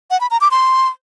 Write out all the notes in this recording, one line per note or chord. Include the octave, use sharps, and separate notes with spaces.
F#5
B5
A#5
D6
C6